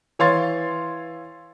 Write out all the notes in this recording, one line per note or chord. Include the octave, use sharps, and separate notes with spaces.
E3 C#5 F5 C6 A6